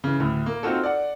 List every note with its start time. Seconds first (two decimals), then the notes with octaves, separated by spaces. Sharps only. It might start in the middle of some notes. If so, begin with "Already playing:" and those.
0.04 C#3 E3
0.20 D2 A2
0.46 A#3
0.63 C4 D#4 F4 F#4 A4
0.83 D5 F#5